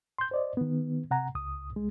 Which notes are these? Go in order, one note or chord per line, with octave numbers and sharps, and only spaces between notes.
C6 G6
C5 D5 D#5
D#3 B3
C3 F#5 A#5
C#2 D#6
C2 G#3